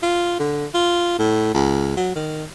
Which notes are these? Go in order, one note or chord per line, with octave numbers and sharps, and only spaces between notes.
F4
D3
F4
A2
C#2
F#3
D#3